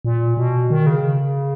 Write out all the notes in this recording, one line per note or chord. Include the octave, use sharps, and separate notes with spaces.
A#2
B2
D#3
C#3